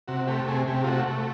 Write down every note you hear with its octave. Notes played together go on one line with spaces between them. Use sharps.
C3 F#4
A3 G4
C3 G#4
C3 G4
F4
A3 F#4
A3